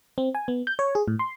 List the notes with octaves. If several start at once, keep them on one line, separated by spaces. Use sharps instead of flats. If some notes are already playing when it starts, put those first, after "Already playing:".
C4
G#5
B3
G6
C#5
G#4
A2
C6